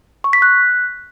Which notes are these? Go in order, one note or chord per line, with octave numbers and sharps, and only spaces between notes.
C#6
B6
F#6